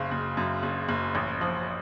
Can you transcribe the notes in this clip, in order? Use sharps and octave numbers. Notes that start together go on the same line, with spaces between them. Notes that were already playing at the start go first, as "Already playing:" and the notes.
Already playing: F#1 C#3
F#1
F#2
F#1
F#1
A1
F3